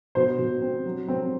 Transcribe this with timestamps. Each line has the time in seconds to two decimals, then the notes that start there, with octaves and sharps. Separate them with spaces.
0.15 B2 C5
0.39 B2
0.62 C4
0.85 F#3
1.08 C4